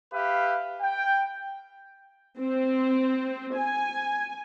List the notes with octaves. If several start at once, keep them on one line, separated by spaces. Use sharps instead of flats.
G4 B4 E5 F5
G5
C4
G#5